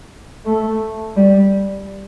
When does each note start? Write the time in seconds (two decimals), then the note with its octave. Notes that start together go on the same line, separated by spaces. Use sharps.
0.45 A3
1.17 G3